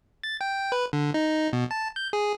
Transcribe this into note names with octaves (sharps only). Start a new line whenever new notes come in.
A6
G5
B4
D3
D#4
B2
A5
G6
G#4